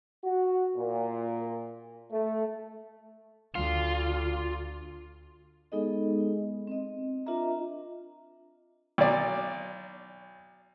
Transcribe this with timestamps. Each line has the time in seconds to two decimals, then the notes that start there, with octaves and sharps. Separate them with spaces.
0.23 F#4
0.77 A#2
2.11 A3
3.55 D2 F4
5.72 G#3 B3 D#4 G#4 A4 D#5
6.67 C4 D#5
7.26 D4 F4 A#4 D#5 E5 A#5
8.98 B1 D5